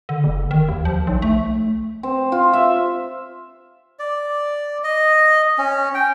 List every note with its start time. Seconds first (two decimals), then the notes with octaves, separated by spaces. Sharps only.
0.09 D3
0.24 F#1
0.51 D#3
0.68 D#2
0.85 F3
1.07 B1
1.22 A3
2.03 C4
2.32 F4
2.53 E5
3.99 D5
4.84 D#5
5.58 C#4
5.94 G5